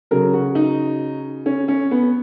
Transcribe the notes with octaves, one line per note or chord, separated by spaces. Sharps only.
C#3 F#3 A#4
F#4
D#4
C#4
C#4
B3